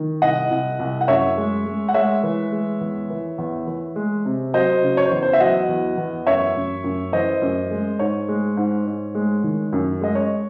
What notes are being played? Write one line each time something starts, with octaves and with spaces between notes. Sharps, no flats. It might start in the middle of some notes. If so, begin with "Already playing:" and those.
Already playing: D#3
C2 D#5 F#5
C2
C2
F#5
F#2 C#5 E5
G#3
G#3
F#5
G#3 C#5 E5
E3
G#3
E2
E3
E2
E3
G#3
C3
F#3 C5 D#5
C#3
C#5
C5
E2
C5
E5
F#3 D#5 F#5
E2
E2
F#2 C#5 E5
F#2
F#2
E3 C5 D#5
F#2
G#3
G#2 C#5
G#3
G#2
G#2
G#3
D#3
F#2
G#3 D#5
C#5